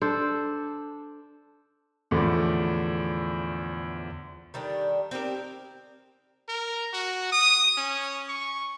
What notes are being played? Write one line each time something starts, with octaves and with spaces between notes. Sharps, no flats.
D4 A4 C5
E2 A2 D3 F3
D#3 G3 A3 D4
C4 D#4 G4 A#4
A#4
F#4
D#6
C#4
C#6